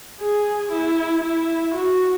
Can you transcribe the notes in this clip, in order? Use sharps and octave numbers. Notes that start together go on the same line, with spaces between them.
G#4
E4
E4
F#4